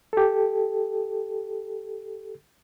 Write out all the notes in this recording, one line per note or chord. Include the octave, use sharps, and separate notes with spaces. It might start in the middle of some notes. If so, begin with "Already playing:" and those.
G4 A4